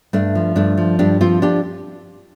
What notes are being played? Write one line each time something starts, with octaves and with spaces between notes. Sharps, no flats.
G2 A3 D4
F3
G2 A3 D4
F3
G2 D4 G4
F3 C4 F4
D4 G4